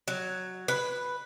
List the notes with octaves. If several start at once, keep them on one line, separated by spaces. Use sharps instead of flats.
F#3
B4